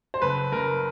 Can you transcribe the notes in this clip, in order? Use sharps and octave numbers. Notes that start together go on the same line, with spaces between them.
C5
F#1 B4
F#1 A#4